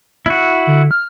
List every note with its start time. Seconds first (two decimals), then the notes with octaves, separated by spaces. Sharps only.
0.26 E4 F#4
0.67 D3
0.91 F6